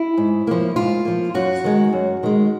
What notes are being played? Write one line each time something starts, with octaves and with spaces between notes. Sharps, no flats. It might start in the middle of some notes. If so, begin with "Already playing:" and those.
Already playing: E4
G#2
F3 A#3
G#2 F4
F3 A#3
F#2 F#4
D#3 G#3
F#2
D#3 G#3